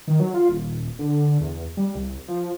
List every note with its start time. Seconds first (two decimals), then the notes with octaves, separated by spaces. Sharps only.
0.07 D#3
0.20 F#3
0.34 F4
0.49 D#1
0.99 D3
1.41 E2
1.77 G3
1.95 C2
2.28 F3